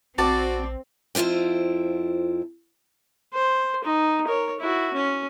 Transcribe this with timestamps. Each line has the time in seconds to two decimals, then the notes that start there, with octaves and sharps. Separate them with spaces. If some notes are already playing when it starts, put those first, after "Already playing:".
0.18 A#1 C4 F#4 D5 A5
1.15 F2 E4 F4 C5 G5
3.34 C5
3.84 D#4
4.27 A#4 C#5
4.60 E4 F#4
4.94 C#4